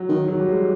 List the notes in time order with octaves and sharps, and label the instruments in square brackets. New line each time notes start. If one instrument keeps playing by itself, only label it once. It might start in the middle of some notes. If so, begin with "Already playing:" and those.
Already playing: [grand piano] F#3
[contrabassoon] D#3
[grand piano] F#3
G3
G#3